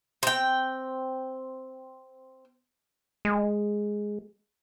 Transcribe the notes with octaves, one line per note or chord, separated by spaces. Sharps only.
C4 G5
G#3